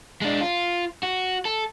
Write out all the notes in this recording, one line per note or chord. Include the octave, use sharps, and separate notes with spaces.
G#3 D4
F4
F#4
A4